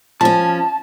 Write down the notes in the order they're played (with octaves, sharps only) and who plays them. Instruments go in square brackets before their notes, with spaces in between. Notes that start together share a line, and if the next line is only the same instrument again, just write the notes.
[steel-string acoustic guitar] F3 C#4 [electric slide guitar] A5